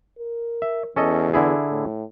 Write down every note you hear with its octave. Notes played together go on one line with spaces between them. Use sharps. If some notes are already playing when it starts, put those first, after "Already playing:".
A#4
E5
E2 C#4 A4 D#5
D3 E4 G#4
A2